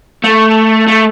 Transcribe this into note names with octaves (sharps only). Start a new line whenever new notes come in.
A3
A3